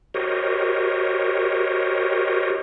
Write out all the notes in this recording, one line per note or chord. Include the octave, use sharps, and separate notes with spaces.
F#4 G4 A#4 C5 C#5 D#5